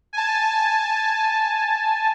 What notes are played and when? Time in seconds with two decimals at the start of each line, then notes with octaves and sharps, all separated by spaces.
0.13 G#5 A5